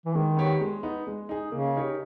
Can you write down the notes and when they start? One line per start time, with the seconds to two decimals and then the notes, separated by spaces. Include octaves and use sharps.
0.05 E3
0.14 D#3 G#3
0.37 B3 G4 C#5
0.61 G#3
0.83 B3 D#4
1.07 G#3
1.29 D#4 G#4
1.52 C#3 A#3
1.76 D#4 G4 A#4 C#5